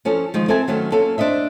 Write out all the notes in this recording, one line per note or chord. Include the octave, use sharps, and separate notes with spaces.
F3 C#4 G#4 A4
D#3 F3 G#3
C4 A4 A#4 E5 G#5 A5
D#3 F#3 A3 C#4
A#3 C#4 F4 A4
D4 C5 D#5 E5